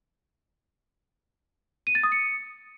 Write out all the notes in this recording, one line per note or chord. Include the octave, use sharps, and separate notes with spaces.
D#7
A6
D#6
C#7